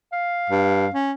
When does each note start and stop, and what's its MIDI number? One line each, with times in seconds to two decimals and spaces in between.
0.12 0.94 77
0.50 0.87 43
0.94 1.12 61